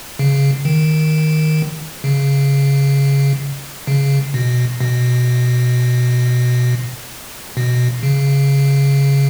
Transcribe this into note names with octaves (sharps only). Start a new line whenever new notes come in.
C#3
D#3
C#3
C#3
B2
B2
B2
C#3